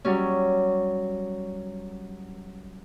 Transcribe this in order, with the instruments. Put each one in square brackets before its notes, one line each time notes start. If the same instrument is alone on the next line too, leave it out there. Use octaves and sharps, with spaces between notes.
[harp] F#3 G3 C#4